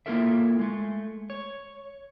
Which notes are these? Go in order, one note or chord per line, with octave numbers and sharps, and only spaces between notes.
A#3 E4 F4 A4 A#4 E5
G#3 A3
C#5